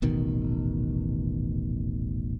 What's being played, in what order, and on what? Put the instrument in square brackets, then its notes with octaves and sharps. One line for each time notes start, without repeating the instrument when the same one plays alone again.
[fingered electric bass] D#1 A1 B2 D#3